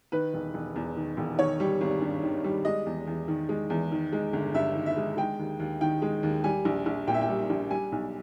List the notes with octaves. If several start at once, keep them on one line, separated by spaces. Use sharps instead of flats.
D#3 B4
E1
E1
E2
D#3
E1
D#3 C#5
G3
G#1
G2
D#3
G3
G#3 D#5
E2
E2
D#3
G#3
E2
D#3
G#3
G1
G2 E5
D#3
E5
G#3
G#3 G5
D#2
D#2
D#3 G5
G#3
D#2
G3 G#5
A#1
A#1
A#2 G5
E5
G5
G3
A#1
G3 G#5
B1